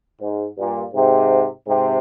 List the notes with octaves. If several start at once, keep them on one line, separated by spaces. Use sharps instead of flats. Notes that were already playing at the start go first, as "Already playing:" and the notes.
G#2
G2 A#2
G#2 C3
G#2 C3